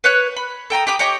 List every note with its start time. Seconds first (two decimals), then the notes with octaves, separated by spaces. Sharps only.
0.04 B4 C#5 F#6
0.36 B5
0.70 A4 G5 A#5 D#6
0.87 G4 B5 D6 D#6
0.99 G4 C#5 D#5 D6